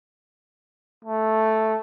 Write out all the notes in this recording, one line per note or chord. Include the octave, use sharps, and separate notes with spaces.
A3